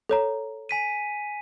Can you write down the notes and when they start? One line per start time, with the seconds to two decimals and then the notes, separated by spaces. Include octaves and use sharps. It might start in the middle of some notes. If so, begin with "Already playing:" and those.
0.09 A4 C#5 A#5
0.69 G#5 B6 D#7